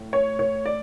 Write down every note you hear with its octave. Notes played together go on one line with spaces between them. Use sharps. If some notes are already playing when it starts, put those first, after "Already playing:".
Already playing: A2
C#5
C#5
D5